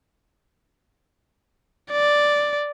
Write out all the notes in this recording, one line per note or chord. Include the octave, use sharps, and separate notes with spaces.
D5